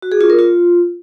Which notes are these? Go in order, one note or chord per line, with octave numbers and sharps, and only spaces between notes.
F#4
G#4
F4
A#4
F4